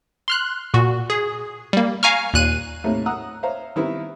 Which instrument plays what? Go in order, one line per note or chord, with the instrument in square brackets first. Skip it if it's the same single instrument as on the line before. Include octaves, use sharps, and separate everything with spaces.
[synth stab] C6 F6 F#6
A#2 F#4
G#4
G3 A#3
F5 G#5 A#5 C#6 F6
D#2 A#2 F#6 D#7
[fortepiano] A2 C3 A3 A#3 D#4
F#5 A#5 D#6 E6 F#6
C5 C#5 E5 F5 A#5
D#3 G3 B3 C4 E4